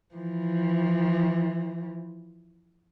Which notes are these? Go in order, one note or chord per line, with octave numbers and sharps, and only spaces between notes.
E3 F3